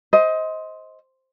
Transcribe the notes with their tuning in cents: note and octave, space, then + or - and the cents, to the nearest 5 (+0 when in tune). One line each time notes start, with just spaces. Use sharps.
C5 +0 D#5 +25